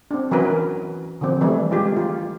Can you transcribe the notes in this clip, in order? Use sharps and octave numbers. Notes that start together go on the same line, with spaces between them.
C4 D4
E3 F#3 C#4 A#4 B4
D3 D#3 F3 C4
E3 G3 A3 G#4
G#3 F4 G4 G#4
F4